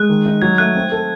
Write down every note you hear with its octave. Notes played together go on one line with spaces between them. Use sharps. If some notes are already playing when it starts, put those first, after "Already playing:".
Already playing: G#3 F#6
D#3
D#4
F#3 G#6
A3 F#6
C4
A4